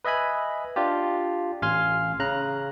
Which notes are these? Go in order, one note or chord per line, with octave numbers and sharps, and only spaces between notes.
B4 D#5 E5 G#5 B5
D4 F4 G4
A1 F5 G#5 C6 F6
C#3 A#5 F#6